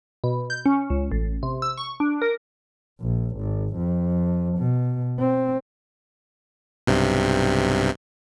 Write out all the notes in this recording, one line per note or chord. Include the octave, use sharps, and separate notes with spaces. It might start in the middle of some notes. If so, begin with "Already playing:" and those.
B2
G6
C#4
C#2
A1
C3
E6
C#6
D4
A#4
A#1
G#1
F2
B2
C4
B1 G2 C3